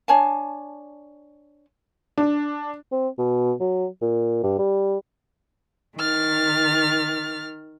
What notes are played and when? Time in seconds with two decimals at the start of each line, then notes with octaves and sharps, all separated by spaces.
0.08 D4 C#5 G#5 A5
2.18 D4
2.92 C4
3.19 B2
3.60 F#3
4.02 A#2
4.44 G2
4.58 G3
5.97 D#3 F6 A6